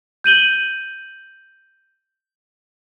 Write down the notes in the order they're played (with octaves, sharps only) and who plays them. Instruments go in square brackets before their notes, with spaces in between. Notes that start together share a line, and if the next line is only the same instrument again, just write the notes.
[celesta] G6 D#7 F#7 G7